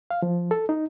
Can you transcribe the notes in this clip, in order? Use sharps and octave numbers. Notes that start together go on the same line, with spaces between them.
F5
F3
A4
D#4